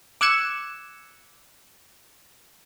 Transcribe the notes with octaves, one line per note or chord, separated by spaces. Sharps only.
D6 E6 F#6 G#6 C#7 E7